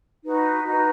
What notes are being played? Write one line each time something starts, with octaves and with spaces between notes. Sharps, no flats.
D#4 F#4 B4
D#4 F#4 B4